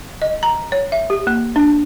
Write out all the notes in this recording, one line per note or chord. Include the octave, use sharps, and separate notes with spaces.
D#5
A#5
C#5
E5
G4
A#3
D4